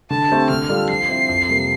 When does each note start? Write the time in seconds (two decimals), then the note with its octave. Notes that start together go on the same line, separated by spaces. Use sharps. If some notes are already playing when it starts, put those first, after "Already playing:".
0.10 D3 A5
0.31 A3 C4 G4
0.50 D3 F6
0.69 G3 D4 F4 A4
0.89 F3 C7
1.09 C4 E4
1.29 F2
1.49 C3 G3 A#3